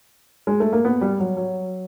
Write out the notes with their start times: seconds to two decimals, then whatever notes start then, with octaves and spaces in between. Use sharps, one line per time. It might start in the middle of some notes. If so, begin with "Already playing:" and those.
0.47 G#3
0.60 A3
0.73 A#3
0.85 B3
1.01 G3
1.20 F#3
1.37 F#3